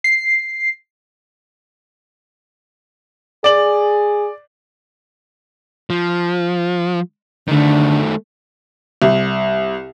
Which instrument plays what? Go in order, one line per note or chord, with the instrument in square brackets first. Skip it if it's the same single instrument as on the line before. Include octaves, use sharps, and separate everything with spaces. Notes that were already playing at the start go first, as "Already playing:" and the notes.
[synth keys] C7
[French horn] G#4 [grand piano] D5 F#7
[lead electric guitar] F3
[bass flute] D3 [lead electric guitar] D#3 A3
[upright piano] C2